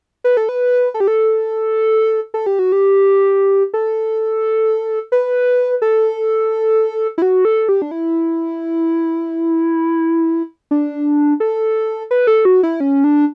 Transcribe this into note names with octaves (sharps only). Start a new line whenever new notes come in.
B4
A4
B4
A4
G4
A4
A4
G4
F#4
G4
A4
B4
A4
E4
F#4
A4
G4
D4
E4
D4
A4
B4
A4
F#4
E4
C#4
D4